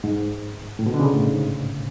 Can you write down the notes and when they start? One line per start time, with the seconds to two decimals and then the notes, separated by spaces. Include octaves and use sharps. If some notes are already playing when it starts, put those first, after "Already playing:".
0.04 G#2
0.79 A2
0.86 B2
0.94 D3
1.00 C#3
1.13 A2
1.26 G#2